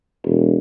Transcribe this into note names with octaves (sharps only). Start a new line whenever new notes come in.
E1